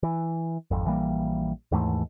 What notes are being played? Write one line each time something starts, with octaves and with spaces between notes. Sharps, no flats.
E3
G#1 F2
A#1 E3 G3 A#3
D#2 G#2 E3 A3